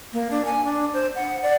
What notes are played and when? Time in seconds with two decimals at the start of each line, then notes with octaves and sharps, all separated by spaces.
0.13 A#3
0.31 D4
0.45 G#5
0.65 D4
0.94 C5
1.16 F#5
1.43 D5